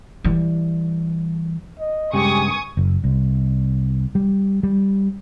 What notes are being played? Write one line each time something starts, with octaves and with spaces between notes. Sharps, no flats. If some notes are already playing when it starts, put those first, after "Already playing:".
E3 G3
D#5
G2 C#3 G#3 G4 G#5 C#6 D#6
F#1
C2
G3
G3